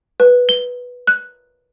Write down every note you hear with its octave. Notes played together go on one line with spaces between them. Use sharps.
B4
G7
F#6